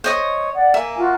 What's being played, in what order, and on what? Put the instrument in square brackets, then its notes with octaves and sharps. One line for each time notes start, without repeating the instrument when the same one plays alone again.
[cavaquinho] C5 D#5 D#6 [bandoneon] C#5
[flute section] D5 F#5
[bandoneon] A#3 [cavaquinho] E5 [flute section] G#5
[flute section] F4 F#4